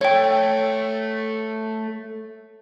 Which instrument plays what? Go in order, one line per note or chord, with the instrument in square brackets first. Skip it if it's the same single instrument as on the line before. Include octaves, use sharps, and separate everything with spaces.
[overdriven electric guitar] A3 [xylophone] C#5 G5